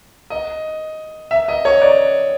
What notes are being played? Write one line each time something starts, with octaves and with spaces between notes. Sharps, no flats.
D#5
E5
D#5
C#5
D5